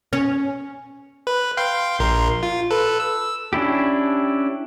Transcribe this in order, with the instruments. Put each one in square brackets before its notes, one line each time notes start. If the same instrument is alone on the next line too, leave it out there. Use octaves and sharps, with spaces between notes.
[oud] C#4
[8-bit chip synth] B4
F5 G5 C6
A#1 A#4 C6
F4
A4 B4
E6
[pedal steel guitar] C#4 D4 E4 G4